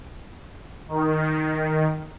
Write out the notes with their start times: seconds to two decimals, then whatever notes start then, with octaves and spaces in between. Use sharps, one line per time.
0.89 D#3